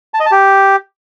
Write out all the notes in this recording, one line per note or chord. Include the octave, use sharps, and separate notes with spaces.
A5
D#5
A5
G4